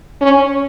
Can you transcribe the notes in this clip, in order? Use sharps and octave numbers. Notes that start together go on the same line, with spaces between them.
C#4